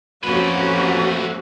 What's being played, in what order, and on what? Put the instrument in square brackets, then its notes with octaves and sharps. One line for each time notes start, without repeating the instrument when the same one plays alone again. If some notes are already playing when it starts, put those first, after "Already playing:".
[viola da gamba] F2 A#3 [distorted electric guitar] A3 B4 [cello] C#4 G4 [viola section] F#4